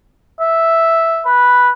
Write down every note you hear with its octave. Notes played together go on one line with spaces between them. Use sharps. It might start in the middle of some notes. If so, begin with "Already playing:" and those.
E5
B4